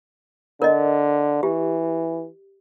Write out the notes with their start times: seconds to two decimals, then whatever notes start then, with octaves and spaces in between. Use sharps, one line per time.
0.62 D3 A#4 D5 D#5
1.43 E3 G4